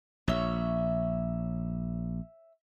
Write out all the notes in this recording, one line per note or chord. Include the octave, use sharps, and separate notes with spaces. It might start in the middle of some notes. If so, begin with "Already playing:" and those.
A#1 C#5 E5